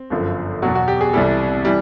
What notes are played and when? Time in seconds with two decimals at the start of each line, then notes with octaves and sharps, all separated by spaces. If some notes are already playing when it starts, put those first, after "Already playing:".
Already playing: C4
0.10 G1 F#2 D3 F3
0.62 E2 B2 F#3 F#4
0.75 F#4
0.88 G4
1.01 G#4
1.13 C2 C3 E3 G3 A4
1.65 E3 G3